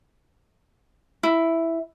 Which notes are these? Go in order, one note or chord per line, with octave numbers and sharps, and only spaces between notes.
E4